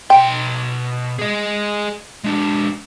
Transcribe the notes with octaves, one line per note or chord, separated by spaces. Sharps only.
B2 G5 C6
G#4 D#5
G#3 D4